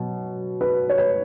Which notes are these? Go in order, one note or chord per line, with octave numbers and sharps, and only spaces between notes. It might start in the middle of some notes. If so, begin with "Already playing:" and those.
Already playing: B2 F#3
B4
C#5
B4